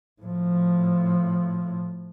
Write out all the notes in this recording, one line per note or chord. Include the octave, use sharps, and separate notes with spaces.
A2 F3